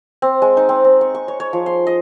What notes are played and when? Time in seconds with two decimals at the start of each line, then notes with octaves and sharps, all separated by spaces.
0.22 C4
0.42 G#3
0.57 D#4
0.69 C4
0.84 C4
1.01 C#6
1.15 C#6
1.28 C#5
1.40 C#5
1.53 F3
1.66 C6
1.87 D#5